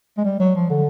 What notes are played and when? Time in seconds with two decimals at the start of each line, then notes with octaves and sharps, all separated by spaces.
0.18 G#3
0.25 G3
0.40 F#3
0.55 F3
0.70 D3